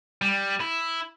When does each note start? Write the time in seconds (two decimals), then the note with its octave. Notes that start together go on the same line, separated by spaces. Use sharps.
0.22 G3
0.60 E4